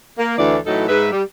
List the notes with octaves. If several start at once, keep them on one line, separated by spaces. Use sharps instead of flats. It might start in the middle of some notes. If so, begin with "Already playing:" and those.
A#3
D2 E3 D5
A2 E3 F#3 D#4 E4 A4
G#2 B4 E5
G3